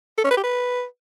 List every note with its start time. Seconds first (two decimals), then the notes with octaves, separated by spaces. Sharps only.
0.18 A4
0.25 C#4
0.31 B4
0.37 G4
0.44 B4